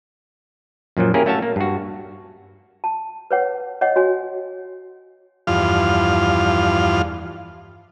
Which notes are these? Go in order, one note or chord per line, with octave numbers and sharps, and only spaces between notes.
F#2 A#2 F3 F#3
A#3 C#4 E4 G4 G#4 A#4
A3 C#4 F#4 E5 F5 A5
A#3
G2 F#4
A5
B4 C#5 F#5
C#5 D#5 F#5
F#4 C#5 G#5
E2 G2 F3 F4 F6